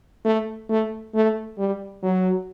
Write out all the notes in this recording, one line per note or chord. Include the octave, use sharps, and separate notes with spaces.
A3
A3
A3
G3
F#3